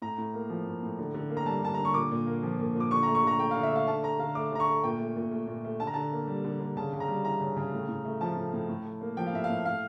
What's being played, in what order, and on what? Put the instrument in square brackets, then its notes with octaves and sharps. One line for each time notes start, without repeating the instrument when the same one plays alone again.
[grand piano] A2 A#5
A2
A#3
F3
A2
A2
D3
D3
A#3
A#5
G3 A5
D3 A5
D3 A#5
C#6
A#2 D6
A#2
A#3
F3
A#2
A#2
D6
D3 C#6
A3 A#5
C#6
D3 A#5
A3 G5
D3 F5
E5
A3 F5
D3 A5
A3 A#5
D3 F5
A3 D6
D3 A#5
C#6
A3
A#2 G5
A3
A#2
A3
A#2
A3
D3 A5
A#5
D3 A5
A#3
G3
D3
D3
C#3 A5
C#3
A#5
G3
E3 A#5
C#3
C#3
A2
A2
A3
F3 A5
A2
A2
A2
A2
A#3
F3 G5
F5
A2 E5
F5
A2
A2 F5